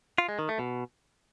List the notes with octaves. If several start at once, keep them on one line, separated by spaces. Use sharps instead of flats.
F4
G#3
D#3
A3
B2